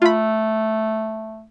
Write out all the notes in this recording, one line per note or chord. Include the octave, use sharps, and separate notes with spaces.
A3 F4 B5